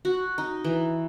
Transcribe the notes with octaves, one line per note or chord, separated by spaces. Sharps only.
F#4
D#4
E3